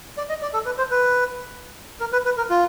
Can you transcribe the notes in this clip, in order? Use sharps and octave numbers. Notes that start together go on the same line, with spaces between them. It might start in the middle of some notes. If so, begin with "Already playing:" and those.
D5
D#5
D5
A4
B4
C5
B4
A#4
B4
B4
A#4
F4